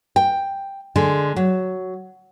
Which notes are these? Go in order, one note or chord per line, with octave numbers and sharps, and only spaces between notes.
G5
D3 G#3
F#3